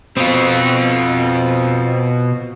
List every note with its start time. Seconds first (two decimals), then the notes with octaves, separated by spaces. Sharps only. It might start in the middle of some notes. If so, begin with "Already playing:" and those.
0.17 B2 C4 F4